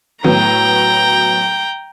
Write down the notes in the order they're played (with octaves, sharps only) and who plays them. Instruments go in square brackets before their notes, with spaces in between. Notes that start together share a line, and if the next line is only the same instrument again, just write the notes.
[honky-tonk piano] A2 F#3 B3 [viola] G5 A#5